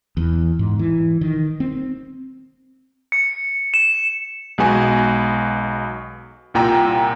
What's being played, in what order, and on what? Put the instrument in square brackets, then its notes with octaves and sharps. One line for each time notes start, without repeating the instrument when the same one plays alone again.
[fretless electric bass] E2
G#2
E3
D#3
C4
[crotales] C#7
E7
[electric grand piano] B1 G#3 B3 F#4 G#5
C2 A#2 G5 A#5 E6